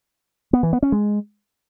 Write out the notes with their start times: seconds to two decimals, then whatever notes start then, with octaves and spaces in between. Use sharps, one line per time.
0.53 B3
0.63 E3
0.73 B3
0.83 C#4
0.92 G#3